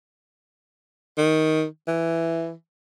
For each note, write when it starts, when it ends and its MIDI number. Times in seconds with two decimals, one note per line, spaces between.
1.18 1.65 51
1.88 2.53 52